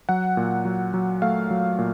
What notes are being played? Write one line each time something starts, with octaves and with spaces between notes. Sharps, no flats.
F#3 F#5
A#2
F#3
F#3
A3 F5
F#3
A#2